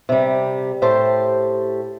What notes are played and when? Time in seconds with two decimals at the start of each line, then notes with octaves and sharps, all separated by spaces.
0.09 C3 G3
0.82 A2 G4 C5 A5